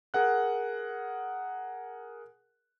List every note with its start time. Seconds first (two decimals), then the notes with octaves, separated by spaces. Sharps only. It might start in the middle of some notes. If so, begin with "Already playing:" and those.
0.14 G#4 A#4 F#5 F#6